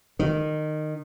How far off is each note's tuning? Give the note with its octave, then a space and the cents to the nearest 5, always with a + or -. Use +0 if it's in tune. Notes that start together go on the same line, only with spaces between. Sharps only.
D#3 -20